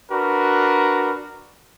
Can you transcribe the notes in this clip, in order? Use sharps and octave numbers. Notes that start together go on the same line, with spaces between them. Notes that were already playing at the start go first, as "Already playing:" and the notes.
D4 F#4 A#4 B4